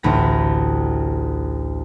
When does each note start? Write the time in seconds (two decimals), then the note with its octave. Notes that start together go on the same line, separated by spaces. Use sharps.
0.03 A1 D2 B5 A#6